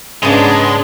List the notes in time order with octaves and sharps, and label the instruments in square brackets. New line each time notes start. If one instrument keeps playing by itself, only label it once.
[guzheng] G#2 C#3 D#4 [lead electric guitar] G#3 [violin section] B3 D4